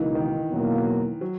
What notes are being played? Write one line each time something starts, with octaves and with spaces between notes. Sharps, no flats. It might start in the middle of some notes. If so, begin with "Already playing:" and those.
Already playing: C#2 B2 E3 A#3 D#4
D#3
E2 B2 F#3 A#3
F#3